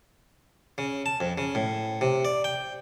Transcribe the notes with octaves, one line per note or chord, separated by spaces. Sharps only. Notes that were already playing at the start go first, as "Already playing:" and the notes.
C#3
A5
F2
C#3
A2
C3
D5
G5